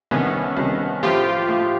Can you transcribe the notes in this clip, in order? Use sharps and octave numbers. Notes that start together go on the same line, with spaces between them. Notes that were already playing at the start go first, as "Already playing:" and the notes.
C2 C3 D#3 B3 C#4
C2 C3 D#3
A2 F3 A3 F4 G4
A2 F3 A3